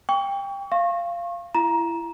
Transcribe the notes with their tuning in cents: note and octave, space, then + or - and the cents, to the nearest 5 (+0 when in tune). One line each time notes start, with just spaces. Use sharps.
G5 +20 C#6 +35
F5 -15 C#6 -35
E4 +25 A#5 +20